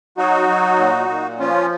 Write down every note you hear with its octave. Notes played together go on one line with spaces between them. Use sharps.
F#3 D#4 F#4
F#3
A#2
A#2
F3 C#4 F4